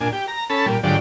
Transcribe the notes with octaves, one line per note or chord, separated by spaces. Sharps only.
A#2 D4 G#5
G4
A#5
C#4 A4 A5 B5
A#2 G3
G#2 D3 F3 F#3 G4 D5